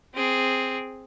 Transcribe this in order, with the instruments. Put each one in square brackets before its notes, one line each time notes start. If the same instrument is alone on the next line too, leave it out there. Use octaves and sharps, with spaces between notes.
[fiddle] C4 G#4